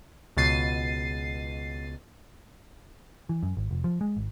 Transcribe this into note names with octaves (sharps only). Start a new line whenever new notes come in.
C#2 B2 A6 C7 D#7
E3
F#2
G#1
F1
F3
G#3
G#1